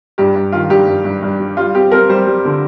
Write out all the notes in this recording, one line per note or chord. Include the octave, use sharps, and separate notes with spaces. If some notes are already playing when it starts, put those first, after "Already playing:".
G2 G4
G2
D#3 F4
G2 G4
G2
G2
G2
G3
G3 F4
C4 G4
C4 A#4
G3 C5
G3
D3